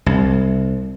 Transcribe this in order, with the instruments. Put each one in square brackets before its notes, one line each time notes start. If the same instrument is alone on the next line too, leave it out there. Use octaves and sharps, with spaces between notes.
[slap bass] C2